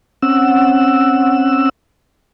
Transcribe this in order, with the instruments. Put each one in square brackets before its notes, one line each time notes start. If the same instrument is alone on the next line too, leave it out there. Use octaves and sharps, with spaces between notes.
[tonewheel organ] C4 C#4 F#5 E6